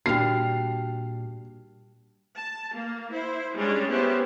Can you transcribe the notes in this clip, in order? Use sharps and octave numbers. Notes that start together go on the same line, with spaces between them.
A#2 G3 D4 F#4 F6 C7 F7
A5
A#3
E4 C5
G3 G#3 C#4 D4
B3 C#4 E4 G4 C5